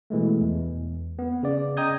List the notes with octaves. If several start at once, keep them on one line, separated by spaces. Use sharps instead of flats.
B2 E3 G#3 A3
E2
B3
C#3 D5
D#5 G5 A#5 D#6 G6 G#6